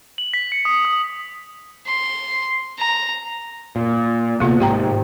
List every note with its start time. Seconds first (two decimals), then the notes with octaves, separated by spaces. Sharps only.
0.18 F#7
0.34 B6
0.52 C#7
0.65 D#6
0.85 D#6
1.86 C6
2.79 A#5
3.76 A#2
4.40 D2 C3 A#3 B3 F4
4.60 G#1 G#2 G4 G5 A#5